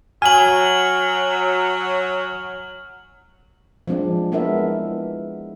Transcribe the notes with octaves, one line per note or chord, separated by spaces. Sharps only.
F#3 G#5 F6 F#7
F3 G#3 C4 D4
G#3 B3 D4 E4 A#4 E5